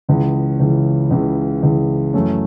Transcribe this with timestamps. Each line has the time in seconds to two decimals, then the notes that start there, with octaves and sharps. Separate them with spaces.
0.09 C#2 C#3 E3
0.60 C#2 C#3 E3
1.11 C#2 C#3 E3
1.63 C#2 C#3 E3
2.14 F#2 E3 A3 C#4